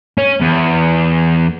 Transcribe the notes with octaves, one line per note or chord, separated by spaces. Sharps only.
C#4
E2